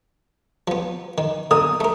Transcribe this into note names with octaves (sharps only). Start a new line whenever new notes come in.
F3 B3
D#3
D3 A#4 D#6
A3 A#4